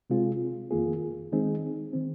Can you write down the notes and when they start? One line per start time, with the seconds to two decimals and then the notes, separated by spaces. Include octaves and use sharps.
0.10 C3 G#3 C4 F4 G#4
0.71 F2 D#3 A#3 F4 G#4
1.32 D#3 G#3 C4 D#4 G#4
1.93 D#3 C4